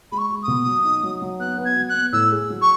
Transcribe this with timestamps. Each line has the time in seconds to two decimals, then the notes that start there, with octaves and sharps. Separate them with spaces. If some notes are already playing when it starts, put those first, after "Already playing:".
0.11 G#3 B5
0.18 C#6
0.30 G#3
0.42 D#6
0.48 B2
0.66 F#3
0.85 D#4
1.03 F#3
1.22 F#3
1.39 B3 F#6
1.58 B3
1.65 G#6
1.76 F#3
1.89 F#6
1.95 B3
2.13 A2 E6
2.32 G#4
2.50 F#3
2.61 C#6